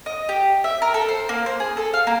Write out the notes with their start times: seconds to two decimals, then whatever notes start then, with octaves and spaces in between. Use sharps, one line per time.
0.06 D#5
0.29 G4
0.64 E5
0.82 A#4
0.94 A4
1.08 C5
1.29 A#3
1.46 C5
1.60 G#4
1.77 A4
1.94 F5
2.07 A#3